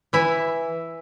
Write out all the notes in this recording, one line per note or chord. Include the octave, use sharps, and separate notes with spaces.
E3 E4 E5